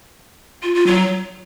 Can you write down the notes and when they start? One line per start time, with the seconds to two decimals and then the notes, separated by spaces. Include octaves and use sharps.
0.63 F4
0.75 F4
0.87 F#3